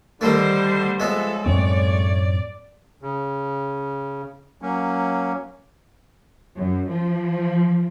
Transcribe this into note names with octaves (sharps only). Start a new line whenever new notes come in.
D3 D#3 G3 A3 C5
F3 G#3 B3 A4 C#5 E5
F#2 A2 A3 C4 C#5 D5
C#3
F#3 A#3 C#4
F#2
F3